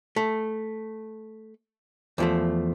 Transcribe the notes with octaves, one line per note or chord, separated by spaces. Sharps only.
A3
E2 F3 A3